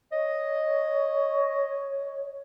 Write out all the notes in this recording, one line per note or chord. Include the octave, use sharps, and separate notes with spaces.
C#5 D#5